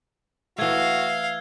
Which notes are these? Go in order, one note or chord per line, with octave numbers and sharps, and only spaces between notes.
E3 A3 F#4 F5 E6 G#6 G7